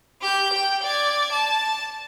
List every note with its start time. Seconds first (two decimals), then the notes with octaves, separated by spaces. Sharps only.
0.21 G4 G6
0.53 G5
0.84 D5 G#6
1.32 A5